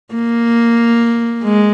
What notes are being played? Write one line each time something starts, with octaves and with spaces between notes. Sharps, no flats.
A#3
G#3